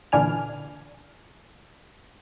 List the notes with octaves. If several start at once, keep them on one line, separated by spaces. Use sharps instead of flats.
A#2 D3 E3 D4 G#5 F6